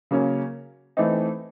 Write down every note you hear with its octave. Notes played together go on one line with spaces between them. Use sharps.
C#3 F#3 A#3 C#4
E3 A3 C4 D#4